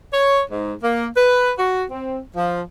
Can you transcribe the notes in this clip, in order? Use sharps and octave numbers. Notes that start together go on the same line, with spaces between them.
C#5
G#2
A#3
B4
F#4
C4
F3